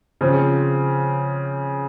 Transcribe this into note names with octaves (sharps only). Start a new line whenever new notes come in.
C#3 F3 C4